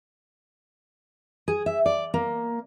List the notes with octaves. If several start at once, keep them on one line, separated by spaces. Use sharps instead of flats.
G#4
E5
D5
A#3